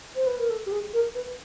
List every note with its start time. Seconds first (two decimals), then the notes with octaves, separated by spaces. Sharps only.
0.16 C5
0.27 B4
0.39 A#4
0.50 A4
0.66 G4
0.72 G#4
0.94 A#4
1.15 B4